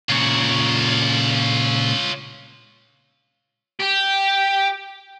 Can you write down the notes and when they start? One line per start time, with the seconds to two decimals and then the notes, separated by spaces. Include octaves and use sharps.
0.10 A#2 C#3 F4 C#5
3.80 G4